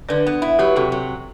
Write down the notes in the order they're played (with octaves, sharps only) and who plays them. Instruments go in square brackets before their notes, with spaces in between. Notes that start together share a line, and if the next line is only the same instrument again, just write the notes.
[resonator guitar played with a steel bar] D3 [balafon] B4 D5
[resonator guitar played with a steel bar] B3
E4
[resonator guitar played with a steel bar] F#3 [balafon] G4 B4
[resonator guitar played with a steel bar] C3 [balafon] F#4 A4
[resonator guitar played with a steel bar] F#3